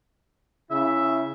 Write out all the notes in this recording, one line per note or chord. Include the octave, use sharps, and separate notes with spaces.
C#3 E4 E5